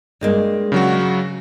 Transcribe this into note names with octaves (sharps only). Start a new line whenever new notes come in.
G2 G#3 A#3
C#3 F#3 F#4